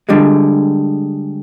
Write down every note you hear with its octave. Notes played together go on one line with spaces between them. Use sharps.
D3 G3 G#3